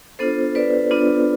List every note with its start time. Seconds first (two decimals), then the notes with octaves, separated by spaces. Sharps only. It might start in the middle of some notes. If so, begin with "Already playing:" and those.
0.19 B3 D4 F4 A4 C5
0.55 B4 D5
0.91 B3 D4 F4